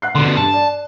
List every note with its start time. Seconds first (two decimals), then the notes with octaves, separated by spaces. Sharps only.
0.02 F#5 F#6 C7
0.15 B2 D3 C6
0.37 G2 A5
0.54 D5